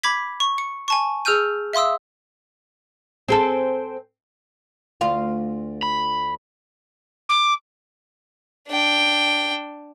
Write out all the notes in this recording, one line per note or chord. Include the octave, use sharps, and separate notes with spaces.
B5 D6 G#6 B6
C#6
C#7
G#5 A5 C#6
G#4 E6 F6 G6 D#7
E5 F5 C6 D#6 E6
C4 G#4 A4
D2 F4 F5
B5
D6
D4 G5